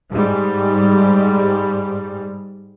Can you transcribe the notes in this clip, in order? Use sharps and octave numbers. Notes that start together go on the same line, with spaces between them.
G#2 G3